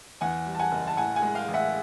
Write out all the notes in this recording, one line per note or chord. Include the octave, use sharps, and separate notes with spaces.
E2 F#5 G#5
G3
A5
F#5 G#5
F#1
A5
A2 F#5 G#5
F#5 G#5
G#3
F5 G5
A1
E5 F#5